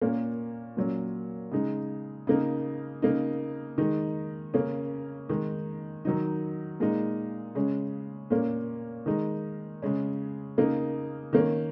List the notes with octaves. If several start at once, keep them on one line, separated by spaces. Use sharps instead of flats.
A#2 A#3 C#4
A#2 F#3 C#4
C#3 G#3 D#4
C#3 A#3 D#4
C#3 A#3 D#4
D#3 G#3 D#4
C#3 A#3 C#4
D#3 G#3 D#4
D#3 F#3 D#4
A#2 G#3 D#4
C#3 G#3 C#4
A#2 A#3 C#4
D#3 G#3 D#4
C#3 G#3 C#4
C#3 A#3 D#4
D#3 A#3 C#4